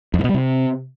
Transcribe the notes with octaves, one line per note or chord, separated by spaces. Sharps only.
F2
G#2
B2
G3
C3